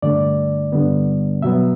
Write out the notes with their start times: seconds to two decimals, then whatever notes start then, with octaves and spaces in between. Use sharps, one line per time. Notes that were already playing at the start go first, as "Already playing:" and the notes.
0.02 G2 D3 A3 D5
0.72 G2 D3 G3 B3
1.42 B2 F#3 B3 E5